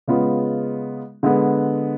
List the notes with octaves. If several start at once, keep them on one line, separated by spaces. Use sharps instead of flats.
C#3 G#3 B3 F4
D3 G#3 B3